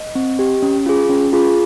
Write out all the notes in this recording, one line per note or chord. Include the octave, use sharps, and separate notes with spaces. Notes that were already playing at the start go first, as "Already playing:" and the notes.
Already playing: D#5
C4
G4
C#4
F4 G#4
C#4
F4 G#4